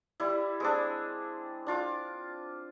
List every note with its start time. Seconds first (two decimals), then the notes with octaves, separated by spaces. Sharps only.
0.20 G3 E4
0.60 G#3 C4 D4
1.67 D4 F4 D6